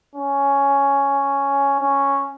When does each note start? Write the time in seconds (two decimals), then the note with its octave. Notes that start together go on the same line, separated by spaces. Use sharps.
0.16 C#4
1.81 C#4